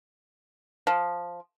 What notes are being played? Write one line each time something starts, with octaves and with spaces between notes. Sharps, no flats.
F3